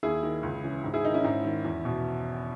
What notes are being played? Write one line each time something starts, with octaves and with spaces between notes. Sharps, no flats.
D#2 E4 G#4
D#3
C#2
C#3 E3
G#2
E4 G#4
D#3 D#4
C#4 E4
G#2
D#3
E2
B2